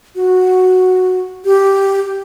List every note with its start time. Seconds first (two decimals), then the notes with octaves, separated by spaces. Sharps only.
0.15 F#4
1.45 G4